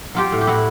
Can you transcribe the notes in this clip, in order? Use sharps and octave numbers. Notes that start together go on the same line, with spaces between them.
F#3 F4 G4
A2
G4
A2 E4 F#4